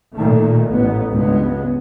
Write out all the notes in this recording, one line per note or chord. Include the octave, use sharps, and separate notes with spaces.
A#2 D#3 A3
A1 B3
C#2 G2 G#3 B3